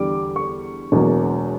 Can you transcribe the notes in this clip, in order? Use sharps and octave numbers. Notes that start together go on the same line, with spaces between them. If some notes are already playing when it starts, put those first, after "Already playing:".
Already playing: E2 D3 G3 D6
C#6
E1 E2 B2 F#3 A#3